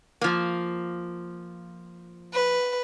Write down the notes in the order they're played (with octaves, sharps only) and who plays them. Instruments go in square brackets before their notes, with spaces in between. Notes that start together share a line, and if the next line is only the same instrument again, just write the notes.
[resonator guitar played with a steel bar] F3 A#3
[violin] B4